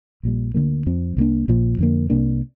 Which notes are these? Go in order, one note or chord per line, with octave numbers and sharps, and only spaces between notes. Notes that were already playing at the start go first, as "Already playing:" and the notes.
A#1 A#2 G3
D2 D3 F3 A#3
F2 F3 C4
C2 C3 A#3 D4
A#1 A#2 F3
F2 D3 A#3
C2 C3 A#3 D4